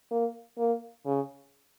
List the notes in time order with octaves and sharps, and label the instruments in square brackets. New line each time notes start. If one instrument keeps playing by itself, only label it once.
[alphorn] A#3
A#3
C#3